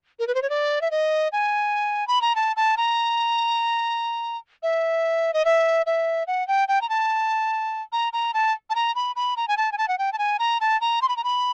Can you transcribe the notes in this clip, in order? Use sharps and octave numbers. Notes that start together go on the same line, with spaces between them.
A#4
B4
C5
C#5
D5
E5
D#5
G#5
B5
A#5
A5
A5
A#5
E5
D#5
E5
E5
F#5
G5
G5
A#5
A5
A#5
A#5
A5
A5
A#5
B5
B5
A#5
G#5
A5
G#5
A5
F#5
G5
A5
G#5
A#5
A5
A#5
C6
B5
A#5
B5